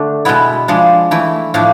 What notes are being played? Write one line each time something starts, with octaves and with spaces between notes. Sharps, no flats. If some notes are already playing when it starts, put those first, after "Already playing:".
Already playing: D3 A3 D4
B2 G#3 B3 E4
F3 G#3 D4
E3 A3 E4
A2 F3 A3 D4